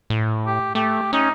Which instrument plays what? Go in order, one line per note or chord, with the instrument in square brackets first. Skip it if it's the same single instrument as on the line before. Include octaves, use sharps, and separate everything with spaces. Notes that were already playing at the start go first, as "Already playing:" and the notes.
[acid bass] A2
[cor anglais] G4
[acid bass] A3 [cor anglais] G4
[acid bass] C#4 [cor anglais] D#4